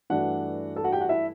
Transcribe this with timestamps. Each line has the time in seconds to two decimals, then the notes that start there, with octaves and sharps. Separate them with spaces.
0.10 G2 E3 A3 D4 F#4 F#5
0.76 A4 A5
0.84 F#4 F#5
0.93 G4 G5
1.01 F#4 F#5
1.09 E4 E5